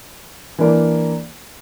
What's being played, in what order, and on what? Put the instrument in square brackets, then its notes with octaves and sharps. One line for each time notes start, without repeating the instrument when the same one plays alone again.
[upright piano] E3 A#3 D4 A#4 D5